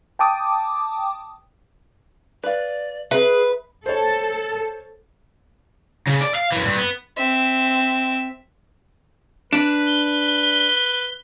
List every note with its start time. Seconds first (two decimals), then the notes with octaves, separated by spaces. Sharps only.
0.19 G5 A5 D6 D#6
2.44 B4 D5 F5
3.11 G#4 B4 E5
3.86 A4 C5 C#5
6.07 C#3
6.20 D5
6.35 F5
6.52 F#2 E3
6.65 G2
6.77 B3
7.18 C4 E5
9.53 D4 B4
9.87 G7